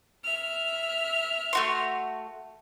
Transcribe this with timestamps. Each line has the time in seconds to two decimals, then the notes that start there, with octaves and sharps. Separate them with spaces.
0.22 E5 F6
1.53 A3 F#4 C6